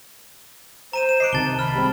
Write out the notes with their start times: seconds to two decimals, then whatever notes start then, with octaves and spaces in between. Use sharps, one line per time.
0.93 C5 A#5 D#7 E7
1.09 E7
1.20 D#5 D6 F#6 C7 D7
1.33 C2 C3 D#3 A5 A6 G7
1.59 B5 F6
1.75 G3 G#3 C4